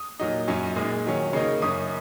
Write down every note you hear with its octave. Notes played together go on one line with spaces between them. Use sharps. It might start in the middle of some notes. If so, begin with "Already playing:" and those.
Already playing: D#6
A#2 F#3 D#4
F#2 F#3 C#4
A#2 G#3 D#4
D#3 F#3 C#4
C#3 A#3 D#4
F#2 C#3 A#3 C#4 D#6